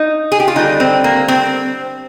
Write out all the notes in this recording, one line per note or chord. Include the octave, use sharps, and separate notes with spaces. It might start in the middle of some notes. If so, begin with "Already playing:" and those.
Already playing: D#4
G#4
G4
F4
D3 G3 D#4
C4
A#3
C4